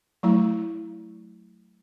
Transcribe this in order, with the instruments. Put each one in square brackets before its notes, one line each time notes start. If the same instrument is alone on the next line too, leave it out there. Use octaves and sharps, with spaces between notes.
[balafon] F#3 A3 E4